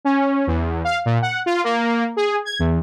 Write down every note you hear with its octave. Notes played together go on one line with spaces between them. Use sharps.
C#4
E2
F5
A#2
F#5
F4
A#3
G#4
G#6
E2